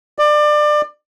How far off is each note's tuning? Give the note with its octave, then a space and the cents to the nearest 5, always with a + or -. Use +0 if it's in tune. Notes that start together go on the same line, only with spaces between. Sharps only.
D5 +25